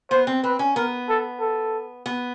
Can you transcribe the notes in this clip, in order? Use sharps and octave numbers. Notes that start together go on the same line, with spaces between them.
B3 C5
C4
C4 B4
C#4
B3 A#4
A4
A4
B3